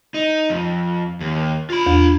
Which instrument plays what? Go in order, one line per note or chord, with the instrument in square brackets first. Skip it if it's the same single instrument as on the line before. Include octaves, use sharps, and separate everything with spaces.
[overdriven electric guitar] D#4
F2
D#2
F4 B5
[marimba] E2